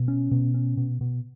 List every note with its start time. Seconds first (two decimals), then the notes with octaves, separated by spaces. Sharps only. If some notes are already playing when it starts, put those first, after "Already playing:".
Already playing: B2
0.08 C#4
0.31 B2
0.54 C#4
0.77 B2
1.01 B2